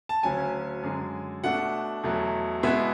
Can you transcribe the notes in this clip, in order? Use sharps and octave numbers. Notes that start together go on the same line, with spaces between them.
A5
D2 C#3 F#3 C#4 G#5
F#2 D3 G#3
B2 A3 D4 F#5
E2 B2 F#3 A3
B2 G#3 B3 E4 E5